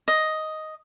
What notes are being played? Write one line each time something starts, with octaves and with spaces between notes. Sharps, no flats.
D#5